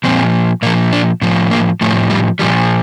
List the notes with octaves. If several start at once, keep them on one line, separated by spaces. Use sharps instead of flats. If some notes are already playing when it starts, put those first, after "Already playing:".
A#2 F3 C4
A#2 F3 A#3
D4
A2 F3
A#3
A2 F3 A3
G3
A#2 F3 G3